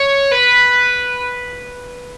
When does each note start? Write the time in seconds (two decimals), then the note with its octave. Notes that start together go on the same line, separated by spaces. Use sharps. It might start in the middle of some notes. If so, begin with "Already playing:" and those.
Already playing: C#5
0.31 B4